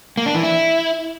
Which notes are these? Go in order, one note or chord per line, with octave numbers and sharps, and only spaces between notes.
A#3
D4
E3
E4